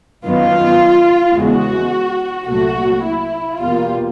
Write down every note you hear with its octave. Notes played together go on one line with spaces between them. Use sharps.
F#2 D#3 F#3 B3 F4
E2 C#3 E3 G#3 F#4
C2 A#2 F#3 A3 F#4
E4
E2 B2 G3 A#3 F4